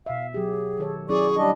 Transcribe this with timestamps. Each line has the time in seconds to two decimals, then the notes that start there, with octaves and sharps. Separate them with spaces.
0.06 B2 E5 F5
0.34 F#3 G4 G#4
0.78 D#3 A4 C#5
1.09 F#3 C#4 E4 G#4 D5 C#6
1.37 G3 D4 D#5